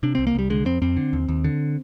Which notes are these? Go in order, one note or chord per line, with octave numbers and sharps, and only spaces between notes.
C3 D4
C2 C4
A#3
C2 G3
D3 G#3
F2 C4
F2 C4
D3
D#2
D#2
D3